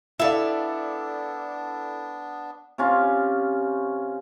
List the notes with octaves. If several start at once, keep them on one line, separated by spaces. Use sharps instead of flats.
B3 D4 E4 A4 D5 E5 F5
C3 C#4 F4